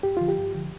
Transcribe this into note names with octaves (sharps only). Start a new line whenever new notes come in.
G2 G4
D3 F3 F4
G4
G2
D3 F3